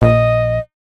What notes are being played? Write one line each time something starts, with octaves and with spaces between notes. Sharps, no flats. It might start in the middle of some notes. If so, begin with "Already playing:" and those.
A#1 D#5